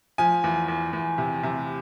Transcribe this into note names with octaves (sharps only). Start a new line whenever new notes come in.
F3 G#5
E2
E2
E2
C3
C3